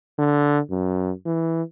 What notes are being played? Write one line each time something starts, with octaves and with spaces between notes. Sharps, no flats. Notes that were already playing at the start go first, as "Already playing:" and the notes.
D3
F#2
E3